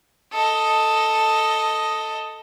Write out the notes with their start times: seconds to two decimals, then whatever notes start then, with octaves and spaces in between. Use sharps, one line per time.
0.33 A4 D#5